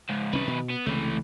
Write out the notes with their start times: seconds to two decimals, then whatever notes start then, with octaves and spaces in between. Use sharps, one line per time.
0.10 C#2 G#2
0.33 C2 D#3 C#4 B4
0.47 B2
0.70 B3
0.86 C#2 C3 E3 A3